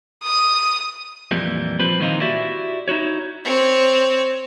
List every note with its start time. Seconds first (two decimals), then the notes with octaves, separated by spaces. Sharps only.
0.24 D#6
1.31 F2 A#2 E3 G3
1.80 F3 G3 C4 B4
2.00 A#2 D#3 E3 C4 D#4 F4
2.21 E4 F#4 G4 D5 E5
2.88 D#4 E4 F#4 C#5
3.45 C4 C#5